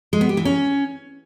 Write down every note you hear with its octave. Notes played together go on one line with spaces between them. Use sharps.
G#3
B3
G4
E3
C#4